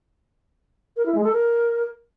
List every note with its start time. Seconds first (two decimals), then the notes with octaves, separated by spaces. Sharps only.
0.97 A#4
1.06 E4
1.15 G#3
1.24 A4
1.33 A#4